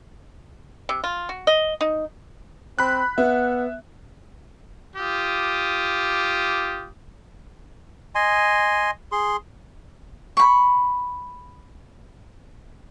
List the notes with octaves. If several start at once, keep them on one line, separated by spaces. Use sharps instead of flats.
C3
F4
F#4
D#5
D#4
C4 B5 F#6
B3 E5 F#5
F4 G4 D6 D#6
D#5 G#5 C6
G#4 C6
B5 C#6